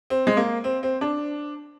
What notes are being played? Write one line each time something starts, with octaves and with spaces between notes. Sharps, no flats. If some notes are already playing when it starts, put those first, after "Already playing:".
C4
G#3
A#3
C4
C4
D4